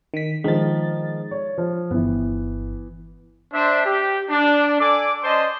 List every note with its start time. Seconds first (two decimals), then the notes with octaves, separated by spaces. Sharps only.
0.14 D#3 B6
0.44 D#3 F3 G#3 A6
1.31 C#5
1.58 F3
1.91 G1 E3 B3
3.53 D4 C5 E5
3.86 G4
4.29 D4
4.80 A4 D5 G#5 D6
5.24 C#4 C5 D5 D#5 A5 C6